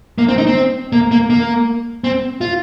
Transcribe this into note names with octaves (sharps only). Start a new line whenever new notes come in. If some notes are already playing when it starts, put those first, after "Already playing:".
A#3
C4
D#4
C4
A#3
A#3
A#3
C4
F4